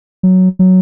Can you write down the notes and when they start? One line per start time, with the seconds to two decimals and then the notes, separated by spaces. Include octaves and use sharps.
0.23 F#3
0.59 F#3